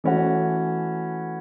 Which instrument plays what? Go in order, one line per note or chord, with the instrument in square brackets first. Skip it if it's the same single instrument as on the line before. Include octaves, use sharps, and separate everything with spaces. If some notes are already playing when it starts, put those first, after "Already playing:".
[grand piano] E3 A3 C#4 F#4